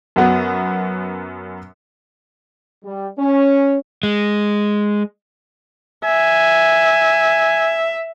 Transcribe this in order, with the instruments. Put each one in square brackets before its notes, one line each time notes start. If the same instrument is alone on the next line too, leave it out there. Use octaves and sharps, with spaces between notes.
[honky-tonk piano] F#2 F#3 B3
[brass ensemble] G3
C#4
[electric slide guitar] G#3
[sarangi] E5 [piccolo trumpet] G#5